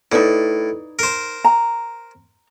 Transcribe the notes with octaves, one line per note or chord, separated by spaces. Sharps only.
A2 D#4 B4 D5
A#4 C5
A#5